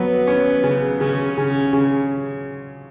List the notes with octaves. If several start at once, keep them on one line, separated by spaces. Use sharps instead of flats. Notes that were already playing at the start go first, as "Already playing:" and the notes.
Already playing: F#3 B3
C#4
C#3
C#3 C#4
C#3
C#3